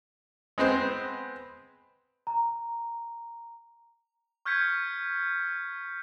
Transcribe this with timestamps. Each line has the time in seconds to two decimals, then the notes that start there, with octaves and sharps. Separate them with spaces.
0.58 G#3 B3 C4 C5
2.27 A#5
4.45 C#6 F6 G6 G#6 B6 C#7